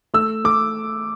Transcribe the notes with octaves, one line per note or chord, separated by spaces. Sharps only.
A3 E6
A3 D6